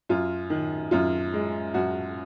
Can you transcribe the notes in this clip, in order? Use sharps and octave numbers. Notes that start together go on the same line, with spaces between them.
F#2 F4
D#3
F#2 F4
G#3
F#2 F#4